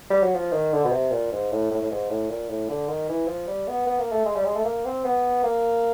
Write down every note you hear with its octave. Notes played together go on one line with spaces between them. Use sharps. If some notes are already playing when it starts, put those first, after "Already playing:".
G3
F#3
F3
D#3
D3
B2
C3
A#2
G#2
A2
A2
A2
G#2
A2
A#2
A2
D3
D#3
E3
F3
G3
B3
B3
A#3
A3
G#3
G3
G#3
A3
A#3
C4
B3
A#3